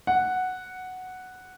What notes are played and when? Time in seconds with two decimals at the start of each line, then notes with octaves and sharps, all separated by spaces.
0.07 F#5